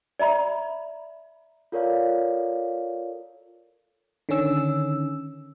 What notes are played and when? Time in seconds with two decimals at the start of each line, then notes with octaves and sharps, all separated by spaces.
0.19 D5 E5 A#5 B5
1.72 F4 A4 A#4 C#5 D5 F5
4.29 D3 D#3 C#4 E6